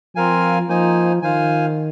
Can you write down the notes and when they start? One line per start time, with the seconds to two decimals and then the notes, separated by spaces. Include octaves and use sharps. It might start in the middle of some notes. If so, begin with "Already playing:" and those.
0.15 F3 C4 F4 A#4 F5 G#5
0.68 F3 A#3 D#4 C5 G#5
1.22 D#3 F4 C5 F5 G#5